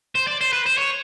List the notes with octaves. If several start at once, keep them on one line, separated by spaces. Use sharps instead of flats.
C5
D5
C5
B4
C5
C#5